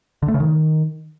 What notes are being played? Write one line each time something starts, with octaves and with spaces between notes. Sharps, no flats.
D3
A3
C#3
D#3